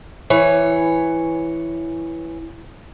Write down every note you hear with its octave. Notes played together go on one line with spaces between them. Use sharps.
E3 C#5